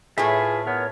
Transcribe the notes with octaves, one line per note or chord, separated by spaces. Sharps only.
A2 A3 F4 G#4 B4 E5
B3 A#4 C#5 F6